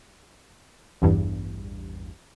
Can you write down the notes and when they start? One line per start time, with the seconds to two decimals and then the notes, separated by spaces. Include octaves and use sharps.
1.02 A1 E2 G2